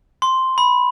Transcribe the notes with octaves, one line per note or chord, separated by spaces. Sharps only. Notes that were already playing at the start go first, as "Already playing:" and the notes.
C6
B5